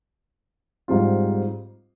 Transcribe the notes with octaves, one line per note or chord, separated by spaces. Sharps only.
G#2 G3 C4 F4